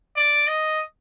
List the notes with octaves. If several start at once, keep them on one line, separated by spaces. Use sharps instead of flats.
D5
D#5